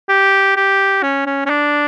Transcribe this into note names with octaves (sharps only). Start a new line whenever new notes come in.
G4
G4
C#4
C#4
C#4
D4